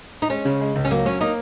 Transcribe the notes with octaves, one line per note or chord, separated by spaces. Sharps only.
D#4
G#3 C#4
C#3
G#3
C#2
C#4
F#3 A#3
F#3 C#4
A#3 D#4